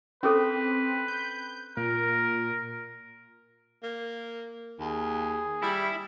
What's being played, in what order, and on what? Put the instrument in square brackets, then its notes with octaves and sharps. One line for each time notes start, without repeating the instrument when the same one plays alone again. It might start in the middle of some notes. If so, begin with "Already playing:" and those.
[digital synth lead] C4 [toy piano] C#4 G#4 A4 [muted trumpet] B4
[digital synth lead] G6
[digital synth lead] A#2 [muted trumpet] A#4
[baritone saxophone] A#3
[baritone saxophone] D#2 [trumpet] G#4
[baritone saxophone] G3 [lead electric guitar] E4